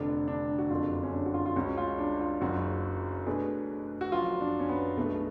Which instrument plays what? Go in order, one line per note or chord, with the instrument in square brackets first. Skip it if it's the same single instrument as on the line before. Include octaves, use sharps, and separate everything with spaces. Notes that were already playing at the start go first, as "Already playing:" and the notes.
Already playing: [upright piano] F1 F2 D3 [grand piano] D4
[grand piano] D4
F#4
[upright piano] F#1 F2 D3 [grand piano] F4
[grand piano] C#4
D4
F#4
F4
F4
[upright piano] C#2 C#3 G#3 C#4 [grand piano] F#4
[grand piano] F4
D4
F4
[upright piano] F#1 F#2 C#3 [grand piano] F#4
[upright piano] B2 A3 D4 G#4 B4
[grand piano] F#4
[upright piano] F#1 F#2 F3 [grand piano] F4
[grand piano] D4
C#4
B3
[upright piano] B1 B2 G#3 B3 D4 [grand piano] A3